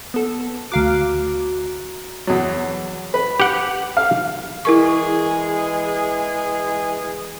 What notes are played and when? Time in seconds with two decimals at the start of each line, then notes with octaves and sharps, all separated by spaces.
0.14 B3 A4
0.72 D2 F#4 F5 A#5 D6
2.27 E2 F#3
3.14 B4
3.40 G4 F#5
3.97 F5
4.65 E3 G#3 E4 G#4 A#4 C#6